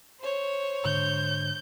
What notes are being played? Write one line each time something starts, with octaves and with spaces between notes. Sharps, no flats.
C5 C#5
G#2 D3 G6